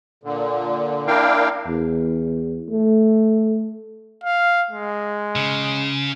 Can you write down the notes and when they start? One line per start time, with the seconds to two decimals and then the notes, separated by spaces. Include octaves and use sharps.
0.23 A#2 D3
1.07 A#3 D4 E4 A#4 F5 G5
1.68 E2
2.69 A3
4.24 F5
4.71 G#3
5.36 C#3